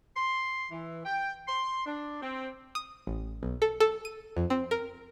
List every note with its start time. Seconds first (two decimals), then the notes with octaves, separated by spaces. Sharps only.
0.16 C6
0.71 E3
1.05 G5
1.48 C6
1.86 D4
2.22 C4
2.75 D#6
3.07 A1
3.43 B1
3.62 A4
3.80 A4
4.05 D#7
4.37 F2
4.50 C4
4.71 A#4